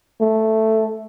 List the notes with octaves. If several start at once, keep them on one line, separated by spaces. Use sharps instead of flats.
A3